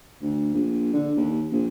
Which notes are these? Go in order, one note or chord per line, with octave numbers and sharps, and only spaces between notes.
D2
A#1
D3
D#2
A#1